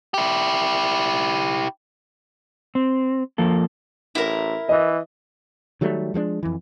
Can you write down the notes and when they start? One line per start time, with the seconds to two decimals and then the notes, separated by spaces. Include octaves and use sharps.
0.14 E4 G4
2.75 C4
3.38 F3 A#3 A4
4.15 A1 E4 A#4
4.69 E3 D#5
5.81 D#3 F#3 G3 A3
6.14 F3 G#3 A#3 D4
6.43 F2 E3